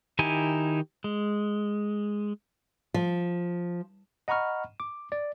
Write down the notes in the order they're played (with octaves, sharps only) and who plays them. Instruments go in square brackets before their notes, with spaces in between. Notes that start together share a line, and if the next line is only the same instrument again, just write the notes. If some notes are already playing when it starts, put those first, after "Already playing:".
[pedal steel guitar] D#3 D#4 E4 G4 G#5
G#3
[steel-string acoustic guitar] F3
[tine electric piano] D#5 F#5 A#5 B5 C#6 F6
D6
D5